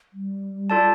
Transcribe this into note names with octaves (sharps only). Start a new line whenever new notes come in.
G3
F4 A4 D5 A5